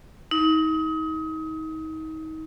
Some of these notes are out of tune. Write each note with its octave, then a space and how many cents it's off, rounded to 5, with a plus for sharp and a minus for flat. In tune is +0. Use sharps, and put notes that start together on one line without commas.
D#4 +30